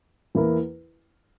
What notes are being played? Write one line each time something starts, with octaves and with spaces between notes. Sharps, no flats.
E2 E3 A#3 E4 A#4